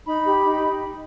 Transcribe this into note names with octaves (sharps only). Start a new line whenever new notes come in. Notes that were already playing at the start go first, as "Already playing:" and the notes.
D#4 B5
G4
D#4